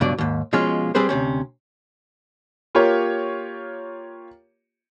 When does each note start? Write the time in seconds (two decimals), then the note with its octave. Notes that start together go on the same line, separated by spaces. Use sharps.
0.01 C#2 G2 B2 F#3 D5
0.18 D#2 G#2
0.53 B2 F3 G#3 C#4 F4
0.95 G3 C4 G#4 B4 C5
1.09 D2 C3 C#4
2.75 A#3 F4 G4 A#4 C#5